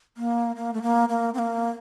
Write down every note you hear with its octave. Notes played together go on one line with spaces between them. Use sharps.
A#3
A#3
A3
A#3
A#3
C4
A#3